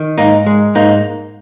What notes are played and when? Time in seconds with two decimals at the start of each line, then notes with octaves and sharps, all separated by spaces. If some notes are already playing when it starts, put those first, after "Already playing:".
Already playing: D#3
0.18 G#2 A#3 D#4
0.46 G#3
0.75 G#2 A#3 D#4